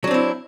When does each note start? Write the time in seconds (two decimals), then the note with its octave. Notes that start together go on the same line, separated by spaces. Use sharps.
0.04 F#3
0.07 D4
0.11 C4
0.14 E4